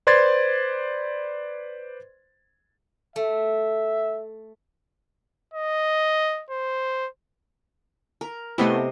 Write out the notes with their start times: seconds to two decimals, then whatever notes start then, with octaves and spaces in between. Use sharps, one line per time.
0.07 B4 C5 D5 C6 G#6 A6
3.16 A3 E5
5.54 D#5
6.51 C5
8.21 A#4
8.58 C3 A3 B3 E4 D#5 C6